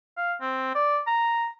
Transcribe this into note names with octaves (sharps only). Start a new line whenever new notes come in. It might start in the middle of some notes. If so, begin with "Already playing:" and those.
F5
C4
D5
A#5